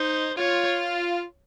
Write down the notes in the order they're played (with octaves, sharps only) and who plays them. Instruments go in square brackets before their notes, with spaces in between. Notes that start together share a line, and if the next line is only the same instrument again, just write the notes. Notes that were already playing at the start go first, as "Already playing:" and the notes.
Already playing: [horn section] D#4 [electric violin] C5
[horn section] F4 [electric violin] C#5